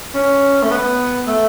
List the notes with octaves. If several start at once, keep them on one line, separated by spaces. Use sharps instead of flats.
C#4
A3
B3
A3